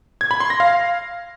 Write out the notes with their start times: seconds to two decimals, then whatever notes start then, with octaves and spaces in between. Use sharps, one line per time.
0.21 G#6
0.31 B5
0.40 C6
0.50 A#6
0.60 F5